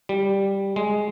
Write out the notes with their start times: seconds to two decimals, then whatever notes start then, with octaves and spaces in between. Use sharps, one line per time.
0.09 G3
0.76 G#3